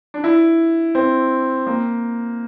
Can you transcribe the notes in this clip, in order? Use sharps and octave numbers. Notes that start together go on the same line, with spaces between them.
D4
E4
C4
A#3